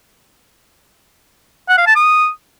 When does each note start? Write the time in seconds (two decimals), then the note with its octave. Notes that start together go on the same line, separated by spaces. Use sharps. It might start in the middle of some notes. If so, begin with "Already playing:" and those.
1.68 F#5
1.77 F5
1.86 A5
1.95 D#6